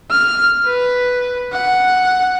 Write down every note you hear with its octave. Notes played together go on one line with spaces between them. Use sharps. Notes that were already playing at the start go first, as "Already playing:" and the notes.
F6
B4
F#5